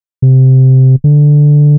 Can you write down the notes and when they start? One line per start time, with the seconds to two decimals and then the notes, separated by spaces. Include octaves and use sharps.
0.22 C3
1.04 D3